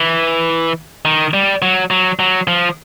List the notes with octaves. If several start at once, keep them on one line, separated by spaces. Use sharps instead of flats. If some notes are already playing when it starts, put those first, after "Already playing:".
Already playing: E3
D#3
G3
F#3
F#3
F#3
F3